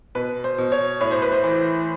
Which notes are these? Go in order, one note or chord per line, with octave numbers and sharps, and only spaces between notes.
B2 B4
C5
B2
C#5
A2 C#5
C5
B4
C5
E3